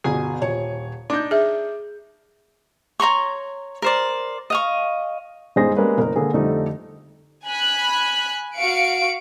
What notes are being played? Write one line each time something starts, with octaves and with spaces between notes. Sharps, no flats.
G1 B2 G#4 G#5
D#1 C#5
D4 D#4 D6 G6
G#4 E5
C#5 A#5 C6 C#6
A#4 C5 D5
D#5 F5 C#6
G1 G#3 D#4 G#4 C5 A#6
G3 G#3 A#3 C#4 A#4 B4
F#1 A#4
D3 A#3 G#4
F2 D3 G3 A3 D#4
G#5 B5 F#6
F#4 F5 C#7 D7